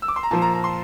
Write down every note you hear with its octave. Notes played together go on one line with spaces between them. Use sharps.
E6
D6
C6
A#5
A#2 F3 A5
A#5
A#5
C6